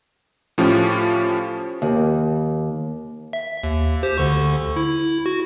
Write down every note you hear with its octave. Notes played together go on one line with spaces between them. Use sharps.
A2 F3 C#4 G4
D#2
E5
D#2
G4 C5
D2 D3 C#6
E4
F#4